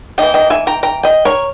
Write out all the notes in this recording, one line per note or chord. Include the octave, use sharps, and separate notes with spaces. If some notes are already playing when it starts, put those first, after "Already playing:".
E3 A#3 D#4 D#5 G5
D#5 G5
E5 G#5
G5 A#5
G5 A#5
D#5 G5
A#4 C#5